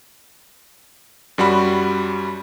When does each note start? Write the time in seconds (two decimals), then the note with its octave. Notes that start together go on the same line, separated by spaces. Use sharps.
1.38 F#2 G3 F#4 B5